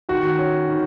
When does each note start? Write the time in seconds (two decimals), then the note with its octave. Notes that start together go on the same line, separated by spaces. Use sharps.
0.09 D#3 F#4
0.39 C#4
0.69 D#3